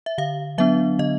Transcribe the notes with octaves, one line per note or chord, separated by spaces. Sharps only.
E5
D3 F5
F#3 B3 D4 E5
D3 D#5